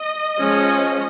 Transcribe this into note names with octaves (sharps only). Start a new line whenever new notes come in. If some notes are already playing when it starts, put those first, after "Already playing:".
Already playing: D#5
F3 G#3 C#4